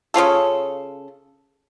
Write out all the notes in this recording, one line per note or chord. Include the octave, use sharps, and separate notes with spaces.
C#3 C#4 F4 A4